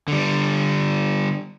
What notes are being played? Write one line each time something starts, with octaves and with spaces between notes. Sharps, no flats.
D3 G3